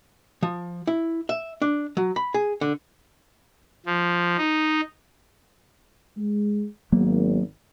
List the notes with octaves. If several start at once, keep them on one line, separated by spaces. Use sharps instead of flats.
F3
E4
E5
D4
F#3
B5
G#4
D3
F3
D#4
G#3
G#1 F#3 A#3 B3